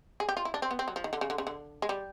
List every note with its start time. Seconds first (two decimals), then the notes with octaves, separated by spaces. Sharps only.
0.20 G#4
0.29 G4
0.37 F4
0.45 E4
0.54 D4
0.62 C4
0.71 B3
0.79 C4
0.88 F#3
0.96 F3
1.04 D#3
1.13 D3
1.21 C#3
1.30 D3
1.38 C#3
1.47 D3
1.82 G#3
1.89 G3